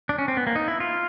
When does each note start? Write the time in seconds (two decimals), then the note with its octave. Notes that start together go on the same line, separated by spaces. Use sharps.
0.09 D4
0.19 C#4
0.28 C4
0.37 B3
0.47 A#3
0.56 D#4
0.68 E4
0.80 F4